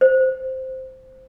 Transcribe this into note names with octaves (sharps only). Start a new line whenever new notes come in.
C5